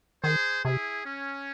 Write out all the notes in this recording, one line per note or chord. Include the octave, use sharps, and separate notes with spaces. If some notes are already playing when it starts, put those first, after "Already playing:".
D#3 G#4 C5
C3 E4 G#4
C#4